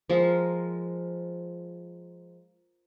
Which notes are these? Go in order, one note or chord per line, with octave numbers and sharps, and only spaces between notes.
F3 G#3 A#4